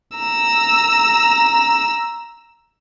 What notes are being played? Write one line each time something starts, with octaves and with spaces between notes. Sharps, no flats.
A#5 E6